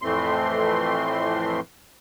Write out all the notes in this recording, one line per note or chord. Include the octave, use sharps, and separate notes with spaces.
F2 A2 E3 A3 C4 C6